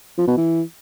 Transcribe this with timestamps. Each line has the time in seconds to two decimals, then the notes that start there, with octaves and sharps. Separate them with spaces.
0.18 F3
0.28 B2
0.37 E3